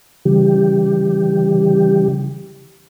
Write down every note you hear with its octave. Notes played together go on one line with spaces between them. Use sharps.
C#3 E3 G3 G4